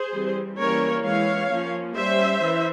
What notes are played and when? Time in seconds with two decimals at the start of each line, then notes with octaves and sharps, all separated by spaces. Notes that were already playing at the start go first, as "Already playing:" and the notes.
Already playing: G#4 C5
0.13 E3 G3 C4
0.58 E3 G3 A#3 C#4 A#4 C#5
1.04 E3 G#3 C#4 C#5 F5
1.50 F3 A#3 C#4
1.96 G3 C#4 C5 E5
2.43 E3